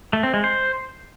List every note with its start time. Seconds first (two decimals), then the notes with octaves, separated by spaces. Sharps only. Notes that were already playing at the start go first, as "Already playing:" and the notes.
0.13 A3
0.23 C4
0.34 G#3
0.44 C5